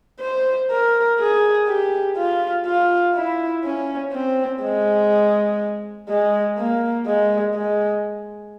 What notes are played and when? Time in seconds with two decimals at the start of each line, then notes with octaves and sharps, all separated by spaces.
0.20 C5
0.71 A#4
1.19 G#4
1.67 G4
2.17 F4
2.66 F4
3.14 E4
3.64 C#4
4.12 C4
4.62 G#3
6.09 G#3
6.57 A#3
7.06 G#3
7.54 G#3